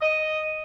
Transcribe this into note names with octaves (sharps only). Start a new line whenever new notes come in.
D#5